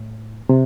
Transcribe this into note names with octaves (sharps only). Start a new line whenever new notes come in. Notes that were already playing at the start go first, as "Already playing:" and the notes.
Already playing: A2
C3